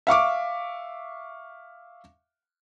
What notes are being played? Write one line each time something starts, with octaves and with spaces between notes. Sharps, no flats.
E5 F5 C#6 D6